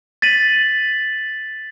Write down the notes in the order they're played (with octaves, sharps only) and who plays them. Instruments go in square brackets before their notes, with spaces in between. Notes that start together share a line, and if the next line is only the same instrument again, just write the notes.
[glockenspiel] A6 B6 D#7 F#7